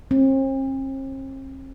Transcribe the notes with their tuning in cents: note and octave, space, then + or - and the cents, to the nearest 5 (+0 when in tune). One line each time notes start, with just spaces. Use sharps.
C4 +45